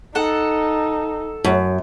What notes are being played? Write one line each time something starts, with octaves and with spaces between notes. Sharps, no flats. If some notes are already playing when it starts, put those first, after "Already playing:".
D#4 A4 F#5
F#2